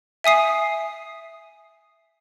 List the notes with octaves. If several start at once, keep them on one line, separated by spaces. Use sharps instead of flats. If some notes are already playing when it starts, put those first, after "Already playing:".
E5 G#5 D#6 C7